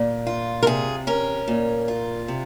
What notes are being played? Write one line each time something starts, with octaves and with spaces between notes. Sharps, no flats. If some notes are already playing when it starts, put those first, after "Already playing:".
Already playing: A#2
F4
A#4
C3 G#4
C#4 A#4
A#2
F4
C3